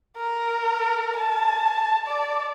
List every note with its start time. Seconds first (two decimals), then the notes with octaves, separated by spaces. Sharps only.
0.17 A#4
1.16 A5
2.07 D5